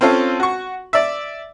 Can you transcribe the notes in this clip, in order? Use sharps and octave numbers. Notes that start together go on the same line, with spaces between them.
C4 C#4 F4 A4 F5
F#4 C#6
D5 E5